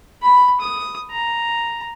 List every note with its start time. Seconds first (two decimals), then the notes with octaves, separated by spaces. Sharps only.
0.23 B5
0.61 D#6
1.11 A#5